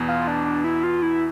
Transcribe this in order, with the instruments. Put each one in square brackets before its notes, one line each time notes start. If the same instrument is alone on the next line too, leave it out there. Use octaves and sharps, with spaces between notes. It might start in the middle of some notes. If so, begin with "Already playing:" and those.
Already playing: [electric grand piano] E2 B2 B3
[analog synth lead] F4
D4
D4
E4
F4
E4